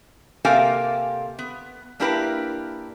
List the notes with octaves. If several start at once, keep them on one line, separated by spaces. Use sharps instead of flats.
C3 A#3 G4 A4 F5 G#5
B3
A#3 D4 E4 G4 A#4 B4